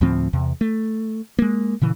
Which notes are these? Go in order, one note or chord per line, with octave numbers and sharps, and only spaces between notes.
D2 A2 F3 C4
E2 C3
A3
G#3 A#3
A#2 C#3 E3